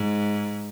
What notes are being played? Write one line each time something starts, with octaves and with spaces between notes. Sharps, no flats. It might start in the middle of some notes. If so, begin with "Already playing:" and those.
Already playing: G#2